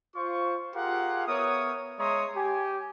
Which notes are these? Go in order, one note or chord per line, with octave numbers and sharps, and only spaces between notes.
F4 C5 C#6
F4 G4 G#4 A#4 F5 F#5
B3 A#4 C#5 E5 D#6
G#3 C#5 E5 A#5 C6 D#6
G4 G#5